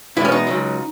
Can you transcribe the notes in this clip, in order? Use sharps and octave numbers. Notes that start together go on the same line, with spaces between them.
E2 B2 G#3 B3 E4
C#4
D#4
C#2 C#3 F#3